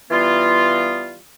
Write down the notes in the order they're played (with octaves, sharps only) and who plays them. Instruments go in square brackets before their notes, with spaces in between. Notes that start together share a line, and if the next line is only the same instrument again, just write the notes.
[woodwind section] E3 G3 B3 F4